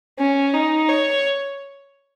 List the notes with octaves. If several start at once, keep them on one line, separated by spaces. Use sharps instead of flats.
C#4
D#4
C#5